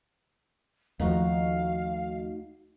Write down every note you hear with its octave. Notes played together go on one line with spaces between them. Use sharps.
D#2 F3 A3 D#4 F#4 F5